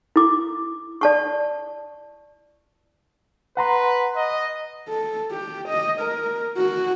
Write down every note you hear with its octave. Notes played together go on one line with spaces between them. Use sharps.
E4 D6
D5 A5 C#6
B4 F#5 A#5 C6
D#5
A4
G4
D#5
A#4
F#4